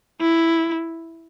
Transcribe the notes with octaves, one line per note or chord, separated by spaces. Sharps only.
E4